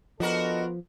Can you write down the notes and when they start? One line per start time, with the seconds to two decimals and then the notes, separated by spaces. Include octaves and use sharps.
0.20 F3 B3 D4 F4 F#4 A4 A#4 D#5